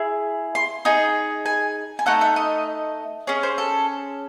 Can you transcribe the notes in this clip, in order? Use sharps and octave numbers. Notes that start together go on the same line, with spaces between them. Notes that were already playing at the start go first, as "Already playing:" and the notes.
Already playing: E4 G#4
C6
D#4 G#4
G#5
G#5
A3 D#4 A4 F#5
E5
D#5
C#4 G#4 C#5
C5
A4